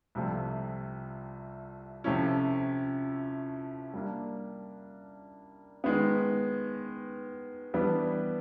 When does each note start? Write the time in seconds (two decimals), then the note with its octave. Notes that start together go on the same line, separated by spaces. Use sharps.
0.15 C2 C3 F3 A3
2.04 C3 F3 A3 C#4 E4
3.94 G3 A#3 D4
5.84 D#3 G#3 B3
7.74 E3 G3 B3 D4